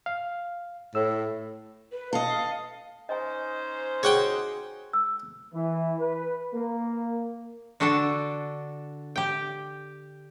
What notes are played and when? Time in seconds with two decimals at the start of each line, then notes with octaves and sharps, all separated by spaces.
0.06 F5
0.95 A2 E6
1.92 B4
2.13 A4 D#5 F5
3.09 C#4 D#4 C5 D#5 G#5
4.03 F#4 G#4 C#5 F#5 G5
4.93 E6
5.54 E3
6.00 B4
6.54 A#3
7.80 D3 D4 F#4 A4 A5
9.16 G4 G5